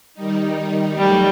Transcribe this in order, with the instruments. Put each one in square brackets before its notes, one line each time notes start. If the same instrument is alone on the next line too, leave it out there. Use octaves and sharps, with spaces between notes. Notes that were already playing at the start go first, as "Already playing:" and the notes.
[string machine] D#3 G3 D#4
[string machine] F#3 A3 D#4 F#4 [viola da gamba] G3